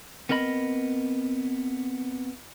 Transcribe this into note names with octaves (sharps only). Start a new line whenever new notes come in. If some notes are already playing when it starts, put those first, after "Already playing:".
B3 C4 A#4 D#5 B5